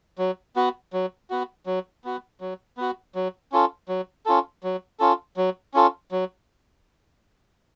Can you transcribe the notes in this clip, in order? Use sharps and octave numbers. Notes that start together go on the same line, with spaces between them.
F#3
B3 F#4
F#3
B3 F#4
F#3
B3 F#4
F#3
B3 F#4
F#3
C#4 F4 A4
F#3
C#4 F4 A4
F#3
C#4 F4 A4
F#3
C#4 F4 A4
F#3